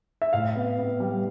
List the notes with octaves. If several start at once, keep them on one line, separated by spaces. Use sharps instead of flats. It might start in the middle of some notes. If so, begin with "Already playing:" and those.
E5
A2 F5
B3
B3
G3